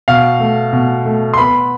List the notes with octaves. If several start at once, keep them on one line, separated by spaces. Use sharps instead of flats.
B2 F5
A3
B2
A3
C6
B3 B5